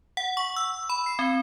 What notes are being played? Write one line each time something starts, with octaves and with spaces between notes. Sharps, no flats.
F#5
C#6
E6
B5
C7
C4